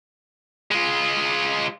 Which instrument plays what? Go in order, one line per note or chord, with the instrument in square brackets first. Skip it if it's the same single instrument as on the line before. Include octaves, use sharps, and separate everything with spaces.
[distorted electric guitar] G#3 F4